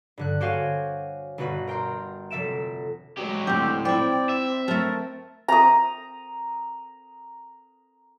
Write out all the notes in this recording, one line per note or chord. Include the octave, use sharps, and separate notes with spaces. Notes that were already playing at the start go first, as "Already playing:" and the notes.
G2 D3 F#6
F#4 G4 C5 C#5 F5 G#5
G1 B2 F#4 B4
A#4 G5 A#5 C6
F1 A4 E5 D7 E7
F#3 G#3 G4
D2 A2 C4 G4
C4 E4 D5 G5
E5
A3 A#4 A5
A#5 D#6